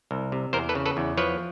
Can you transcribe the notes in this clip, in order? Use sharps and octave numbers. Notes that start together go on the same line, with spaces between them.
C2
C3
E2 A#4 C5
A4 B4
C#3
A4 B4
E2
F3 B4 C#5